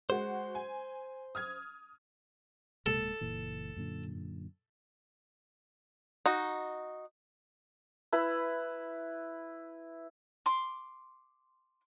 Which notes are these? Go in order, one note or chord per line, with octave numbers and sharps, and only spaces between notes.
G#3 F#4 C5
G#5
D#6 F6 G#6
D1 G#3 A#3 A4
F#1 A#2 E3
F#2 A#2 D3
D#4 F#4
E4 B4 B5
C6 D6